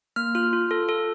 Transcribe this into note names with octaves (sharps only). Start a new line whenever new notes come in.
A#3 F6
F4 F6
F4
A4
A4